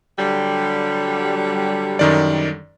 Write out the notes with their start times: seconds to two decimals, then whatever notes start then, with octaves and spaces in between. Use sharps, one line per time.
0.18 D3 F#3 G3
1.99 F#2 D#3 D5